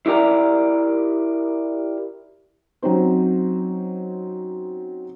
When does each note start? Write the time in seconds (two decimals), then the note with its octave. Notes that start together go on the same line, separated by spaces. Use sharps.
0.06 E4 G4 A#4 D5 A#5
2.82 F#3 C4 C#4 D#4 C5